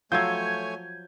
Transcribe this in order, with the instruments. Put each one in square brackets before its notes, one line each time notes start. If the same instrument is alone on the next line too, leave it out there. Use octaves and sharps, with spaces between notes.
[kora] F3 F#3 E5 [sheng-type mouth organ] A3 C#5 G#5 [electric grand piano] G6 G#6